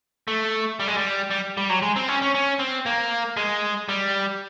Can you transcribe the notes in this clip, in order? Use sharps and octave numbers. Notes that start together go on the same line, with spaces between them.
A3
G3
G#3
G3
G3
G3
F#3
G#3
C4
C#4
C#4
C#4
C4
A#3
G#3
G3